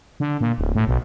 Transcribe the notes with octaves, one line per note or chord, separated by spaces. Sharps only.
D3
A#2
D1
A2
B1